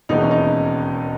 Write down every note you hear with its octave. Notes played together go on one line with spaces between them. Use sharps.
E1 D#2 C#3 E3 B3 D#4
C#4
D#4